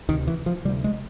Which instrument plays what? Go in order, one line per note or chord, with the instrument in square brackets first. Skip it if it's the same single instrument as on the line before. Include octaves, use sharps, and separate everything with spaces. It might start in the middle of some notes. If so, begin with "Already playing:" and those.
[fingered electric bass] D2 C3 D#3
E3
F3
C3 G3
D2
G#3